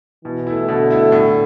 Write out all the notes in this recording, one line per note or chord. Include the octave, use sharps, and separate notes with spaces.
B2 E3
A3 E4
B2 D3
A3 E4
A2